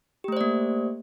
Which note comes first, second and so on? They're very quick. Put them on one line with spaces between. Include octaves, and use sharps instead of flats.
G4 A3 C5 D5 A#3